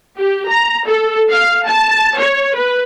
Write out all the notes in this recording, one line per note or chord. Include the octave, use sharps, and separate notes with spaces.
G4
A#5
A4
F5
A5
C#5
B4